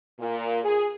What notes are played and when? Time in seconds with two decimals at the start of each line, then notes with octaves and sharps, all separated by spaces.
0.19 A#2
0.64 G#4